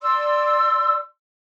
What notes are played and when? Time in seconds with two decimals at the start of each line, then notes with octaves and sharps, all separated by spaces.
0.02 D5 C6 E6